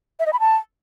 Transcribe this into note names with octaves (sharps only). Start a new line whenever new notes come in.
E5
D#5
B5
A5